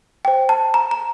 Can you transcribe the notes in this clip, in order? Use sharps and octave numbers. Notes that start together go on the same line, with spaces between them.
C5 G5
A5
A#5
A#5